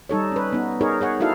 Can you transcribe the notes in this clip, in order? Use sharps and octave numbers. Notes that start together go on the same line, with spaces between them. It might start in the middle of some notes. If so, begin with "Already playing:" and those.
G3 D#4 A4 C#5
C#4 B4
B3 D#4
D#4 G#4 A#4 C#5
G#4 C#5 F#5
D#4 E4 F#4 A4 F5